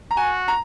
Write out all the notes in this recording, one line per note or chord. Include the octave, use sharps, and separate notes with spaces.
A#5
F#4 G#5
A#5